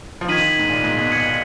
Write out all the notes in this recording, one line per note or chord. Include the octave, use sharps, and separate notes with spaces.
F3
D#3 G#6 B6 D#7 F#7
G#2
A#2
G#2
B2
G#6 C#7 F#7